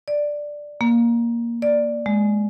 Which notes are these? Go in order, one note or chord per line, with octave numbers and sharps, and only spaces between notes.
D5
A#3
D5
G#3